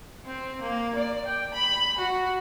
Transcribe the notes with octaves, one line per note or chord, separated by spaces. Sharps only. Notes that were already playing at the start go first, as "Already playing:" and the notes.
C4
A#3
D5
G5
B5
F#4